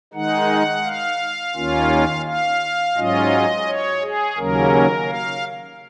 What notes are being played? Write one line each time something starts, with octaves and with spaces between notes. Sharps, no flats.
D#3 G#3 D#4 F#5
F5
D#2 D#3 A#3 C#4 F4
F5
G#2 F#3 C#4 F4 D#5
C#5
G#4
D#2 C#3 F#3 A#3 C#4 A#4
F5